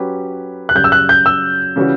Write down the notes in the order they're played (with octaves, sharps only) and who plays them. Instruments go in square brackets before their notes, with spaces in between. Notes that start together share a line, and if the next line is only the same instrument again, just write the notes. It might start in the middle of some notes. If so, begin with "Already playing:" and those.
Already playing: [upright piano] F#3 C#4 G4 B4
[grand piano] F#6
[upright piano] F#2 C#3 G3 [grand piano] G6
[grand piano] E6
F#6
G6
E6
[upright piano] C#3 E3 G3 C#4 F#4